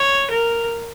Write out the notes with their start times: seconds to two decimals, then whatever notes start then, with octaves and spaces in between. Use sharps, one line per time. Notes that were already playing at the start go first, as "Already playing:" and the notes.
Already playing: C#5
0.30 A#4